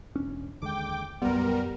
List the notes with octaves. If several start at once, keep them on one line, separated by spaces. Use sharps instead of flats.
E1 C#4 D4
D#2 D3 G#3 G5 D6
A#1 F#2 G3 B3 A#4